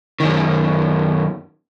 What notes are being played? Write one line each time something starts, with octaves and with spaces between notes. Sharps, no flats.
F#2 D#3